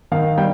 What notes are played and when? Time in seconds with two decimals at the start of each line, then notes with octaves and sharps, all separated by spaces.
0.12 D#3 F5
0.38 G3 G5